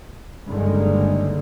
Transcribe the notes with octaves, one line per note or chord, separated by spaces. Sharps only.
F#1 G2 D3 D#3 G#3